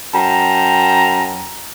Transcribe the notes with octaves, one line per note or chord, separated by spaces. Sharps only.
F#2 G5 A5 A#5